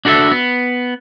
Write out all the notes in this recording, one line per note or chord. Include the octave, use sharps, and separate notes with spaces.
D4 F#4 A4 C#5 E5
B3